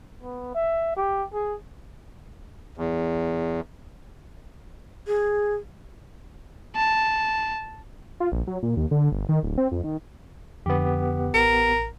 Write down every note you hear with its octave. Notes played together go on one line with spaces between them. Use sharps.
B3
E5
G4
G#4
E2
G#4
A5
F4
A#1
F#3
A#2
D#2
D3
G1
D#3
D1
C4
F2
D#3
F2 D3 B3 G4
A1 A#4